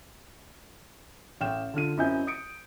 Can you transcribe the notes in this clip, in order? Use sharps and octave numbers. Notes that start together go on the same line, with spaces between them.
A1 G5 F6 E7
D3 F4 F6 D#7
F#2 C4 E4 D#5 G#5 G6
D#6 C#7 D7